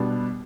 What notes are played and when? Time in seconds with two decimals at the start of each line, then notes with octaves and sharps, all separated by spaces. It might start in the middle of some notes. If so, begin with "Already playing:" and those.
Already playing: B2 G3 B3 D4